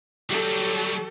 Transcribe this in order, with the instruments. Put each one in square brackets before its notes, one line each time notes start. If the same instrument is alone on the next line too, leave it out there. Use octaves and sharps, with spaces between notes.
[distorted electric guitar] F#3 G3 [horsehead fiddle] G4 A4